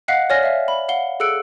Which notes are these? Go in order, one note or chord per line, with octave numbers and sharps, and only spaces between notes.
D#5 F5 F#5 F#6 B6 C7
C#5 D5 G#5 F6 A#6
E5 F5
B5
F5 F#5 G7
G#4 A4 E6 F#6 C#7 D7